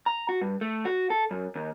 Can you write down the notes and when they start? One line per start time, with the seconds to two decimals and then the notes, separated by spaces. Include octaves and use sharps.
0.06 A#5
0.29 F#4
0.41 G2
0.61 A3
0.85 F#4
1.10 A4
1.31 F#2
1.55 D#2